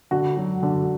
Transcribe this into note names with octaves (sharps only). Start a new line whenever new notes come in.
D3 F#4
F#3
D3